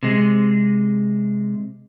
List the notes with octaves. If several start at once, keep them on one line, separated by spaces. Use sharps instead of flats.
C3 G#3